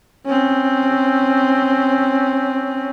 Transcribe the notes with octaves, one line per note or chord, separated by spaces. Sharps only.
C4 C#4